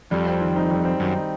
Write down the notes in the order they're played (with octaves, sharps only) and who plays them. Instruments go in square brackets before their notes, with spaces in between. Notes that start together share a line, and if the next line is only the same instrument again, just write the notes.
[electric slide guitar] F2 [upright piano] G3
[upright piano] C4
D#3
D#4
G3
C4
[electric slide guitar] F#2 [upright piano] D#3
[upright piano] D#4